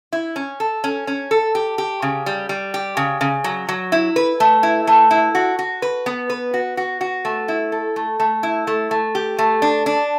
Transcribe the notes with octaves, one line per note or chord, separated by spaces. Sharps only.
E4
C#4
A4
C#4
C#4
A4
G4
G4
C#3
G3
G3
G4
C#3
C#3
F#3
F#3
E4
B4
A3
E4
A3
E4
F#4
F#4
B4
B3
B4
F#4
F#4
F#4
A3
E4
A4
A3
A3
E4
A3
A3
G4
A3
D4
D4